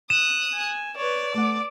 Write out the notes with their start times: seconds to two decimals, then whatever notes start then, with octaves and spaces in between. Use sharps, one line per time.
0.10 D#6 F#6 E7
0.52 G#5
0.97 B4 C#5 D5
1.34 A3 F#5 D6